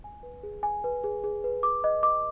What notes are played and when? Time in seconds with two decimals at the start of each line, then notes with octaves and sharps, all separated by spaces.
0.04 G#5
0.23 B4
0.43 G#4
0.63 G#5
0.84 B4
1.04 G#4
1.24 G#4
1.44 B4
1.63 D6
1.84 D#5
2.03 D6